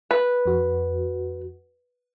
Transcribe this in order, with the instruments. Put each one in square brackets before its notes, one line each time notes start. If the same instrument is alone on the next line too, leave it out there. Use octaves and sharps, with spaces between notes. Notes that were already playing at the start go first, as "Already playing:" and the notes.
[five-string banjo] B4
[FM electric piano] F2 F#4